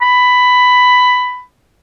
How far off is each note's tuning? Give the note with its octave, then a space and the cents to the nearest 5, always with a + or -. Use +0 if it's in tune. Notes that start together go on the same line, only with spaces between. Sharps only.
B5 +10